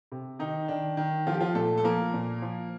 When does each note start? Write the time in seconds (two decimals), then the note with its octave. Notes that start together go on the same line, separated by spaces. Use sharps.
0.12 C3
0.39 D#3 D#4
0.68 D#3 D4
0.97 D#3
1.27 F3 F4
1.34 G4
1.41 F3 F4
1.55 A#2 A3 A4
1.78 A4
1.84 F3 A#3 A#4
2.14 A#2
2.42 F3